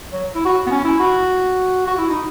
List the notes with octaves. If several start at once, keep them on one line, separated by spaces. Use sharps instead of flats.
F#3
E4
F#4
B3
C#4
E4
F#4
F#4
E4
D#4